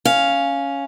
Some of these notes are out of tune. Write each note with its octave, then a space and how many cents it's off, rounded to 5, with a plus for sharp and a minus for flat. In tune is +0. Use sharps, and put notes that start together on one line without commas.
C#4 +0 F5 +0